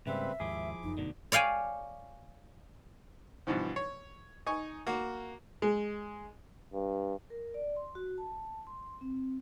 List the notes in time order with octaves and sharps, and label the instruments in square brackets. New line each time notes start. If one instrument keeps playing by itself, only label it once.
[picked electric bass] G#2 [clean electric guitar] C#3 G3 A#3 [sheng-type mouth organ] C4 B4 [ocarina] E5
[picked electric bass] D#2 G#2 [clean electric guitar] F3 E4 G#4 [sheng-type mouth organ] D6
[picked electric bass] F#1 F#2 [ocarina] D#4
[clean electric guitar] D2 B2 D3
[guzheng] C#5 D5 F5 G5 G#5
[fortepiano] G2 B2 E3 F3
C#5
D#4 G#5 C#6
A#3 F#4
G#3
[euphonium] G2
[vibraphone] A#4
D5
C6
F#4
A5
C6
C4